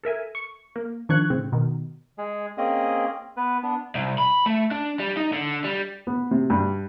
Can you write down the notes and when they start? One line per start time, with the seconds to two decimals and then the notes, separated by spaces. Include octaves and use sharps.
0.03 A4 A#4 E5 G#5
0.35 C#6
0.76 A#3
1.09 D#3 F3 D4 C#6 F#6 G#6
1.30 A2 C#3 C4
1.52 B2 D#3
2.18 G#3 G#4
2.58 A#3 C4 C#4 G#4 D#5 D#6
3.37 B3 B4
3.63 B3 D4
3.95 C2
4.18 B5
4.46 A3
4.71 D4
5.00 G3
5.17 D#4
5.32 D3
5.64 G3
6.07 B3
6.31 C3
6.50 G2